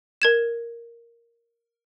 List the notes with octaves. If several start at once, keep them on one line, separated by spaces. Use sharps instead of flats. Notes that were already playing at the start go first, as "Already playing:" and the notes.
A#4 G#6 E7